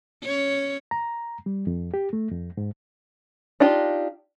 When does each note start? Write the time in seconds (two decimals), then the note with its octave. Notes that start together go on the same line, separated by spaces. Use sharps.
0.23 C#4 C#5
0.91 A#5
1.46 G3
1.67 F2
1.94 G4
2.13 A3
2.31 F2
2.57 G#2
3.60 D4 D#4 F4 G4